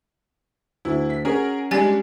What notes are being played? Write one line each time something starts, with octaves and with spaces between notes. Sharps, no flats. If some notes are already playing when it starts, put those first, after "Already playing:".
D2 E4
B6
C#4 F#4 G#4 A#4
G3 G#3 D4 G4 G#5 A6